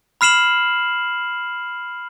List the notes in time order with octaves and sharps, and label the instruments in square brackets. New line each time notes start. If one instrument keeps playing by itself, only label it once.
[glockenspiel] B5 F6 C7 E7 F#7